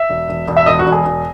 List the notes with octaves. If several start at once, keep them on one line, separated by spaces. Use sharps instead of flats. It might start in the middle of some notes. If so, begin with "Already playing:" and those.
Already playing: E5
E1
E1
E1
E5
E1 D#5
F#4
E1
G#4
E1